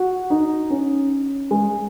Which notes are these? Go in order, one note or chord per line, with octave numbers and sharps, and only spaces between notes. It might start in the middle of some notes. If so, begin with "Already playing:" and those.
Already playing: F#4
D#4
C#4
G#3